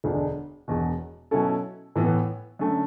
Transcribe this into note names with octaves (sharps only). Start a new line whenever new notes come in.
E1 D2 D3 G#3 D4
E1 E2 B2
B2 F#3 C#4 E4 A4
A2 E3 B3
F#2 D3 A3